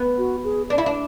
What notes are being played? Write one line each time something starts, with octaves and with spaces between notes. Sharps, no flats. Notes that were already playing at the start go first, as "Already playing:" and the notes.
Already playing: B3
F#4
G#4
D4 D5
E4
D4